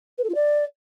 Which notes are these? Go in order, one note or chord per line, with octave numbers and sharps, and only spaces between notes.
B4
A4
F4
D5